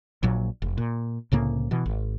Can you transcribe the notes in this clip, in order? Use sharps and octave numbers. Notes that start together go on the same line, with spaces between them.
A#1 A#2 F#3
F1
A#2
C2 A2 C#3 A#3
B2 E3
G#1